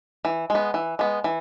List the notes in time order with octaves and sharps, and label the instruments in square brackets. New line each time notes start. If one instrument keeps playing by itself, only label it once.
[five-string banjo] E3
G#3
B3
E3
G#3 B3
E3